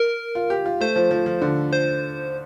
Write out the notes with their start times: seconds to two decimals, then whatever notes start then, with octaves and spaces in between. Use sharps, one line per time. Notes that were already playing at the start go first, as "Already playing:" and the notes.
Already playing: A#4
0.35 F4
0.50 G4
0.66 F4
0.81 A3 C5
0.96 F3
1.11 F3
1.26 F3
1.41 D3
1.73 C5